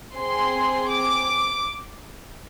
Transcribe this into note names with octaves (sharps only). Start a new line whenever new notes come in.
C4 G#4 C6
D6